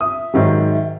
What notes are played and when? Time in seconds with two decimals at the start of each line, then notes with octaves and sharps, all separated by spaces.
0.01 E5 D#6
0.34 G#2 D#3 F#3